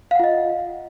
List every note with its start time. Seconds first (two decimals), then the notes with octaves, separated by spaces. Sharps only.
0.11 F5
0.15 F#5
0.19 F4
0.24 D#5